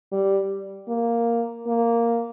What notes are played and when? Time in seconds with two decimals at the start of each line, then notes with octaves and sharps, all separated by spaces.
0.12 G3
0.89 A#3
1.67 A#3